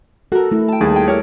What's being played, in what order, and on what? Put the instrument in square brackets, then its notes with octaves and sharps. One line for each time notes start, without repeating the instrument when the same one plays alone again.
[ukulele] F#4 A#4 [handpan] A4
[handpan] A3 E4
[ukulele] G5 A5
[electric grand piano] D#2 G#4 A5 [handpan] G3 [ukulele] D#4 E4
[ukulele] G5
[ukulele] E4 G4 A#4 [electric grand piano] C#5